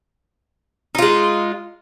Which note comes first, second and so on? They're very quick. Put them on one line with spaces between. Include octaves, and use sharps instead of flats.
D#4 F4 G#3